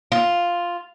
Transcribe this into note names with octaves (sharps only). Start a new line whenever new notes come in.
F4